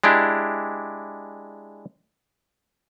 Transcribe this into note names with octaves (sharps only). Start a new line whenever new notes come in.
G#3 D4 E4 G4